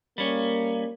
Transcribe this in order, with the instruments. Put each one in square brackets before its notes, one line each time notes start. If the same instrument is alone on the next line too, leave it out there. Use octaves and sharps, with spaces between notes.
[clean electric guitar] G3 C#4 [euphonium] A#3